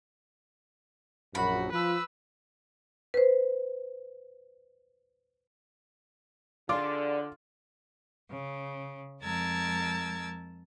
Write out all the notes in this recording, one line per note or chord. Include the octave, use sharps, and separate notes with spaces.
A#1 F#2 F#4 B5
F3 B4 E6
B4 C5
D3 F4 G#4 D5 F5 D6
C#3
F2 G#3 A#4 A5 E6 G#6